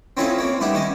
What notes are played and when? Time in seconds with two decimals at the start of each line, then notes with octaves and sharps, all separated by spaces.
0.17 C4 C#4 E4 F4 A4 D#5
0.38 A#3 C4 C#5
0.61 G3 B3 D#4 E4 G4
0.74 D#3 C#4 D#5